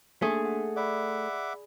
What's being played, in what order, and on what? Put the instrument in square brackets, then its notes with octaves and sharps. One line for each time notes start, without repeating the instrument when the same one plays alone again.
[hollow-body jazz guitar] A3 [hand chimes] A#3 D4 [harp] G#4
[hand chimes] F#5
[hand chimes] D5 B5 [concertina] E5 F#5 D6